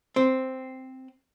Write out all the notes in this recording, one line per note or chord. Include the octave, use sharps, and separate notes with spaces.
C4